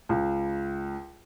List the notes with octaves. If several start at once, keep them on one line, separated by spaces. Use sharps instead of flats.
C#2